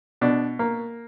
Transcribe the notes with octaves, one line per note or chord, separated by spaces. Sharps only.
B2 D4
A#3